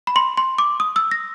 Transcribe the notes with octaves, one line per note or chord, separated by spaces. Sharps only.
B5
C6
C6
D6
D#6
E6
A#6